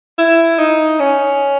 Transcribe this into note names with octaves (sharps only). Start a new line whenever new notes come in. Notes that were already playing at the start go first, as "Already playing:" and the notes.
E4
D#4
C#4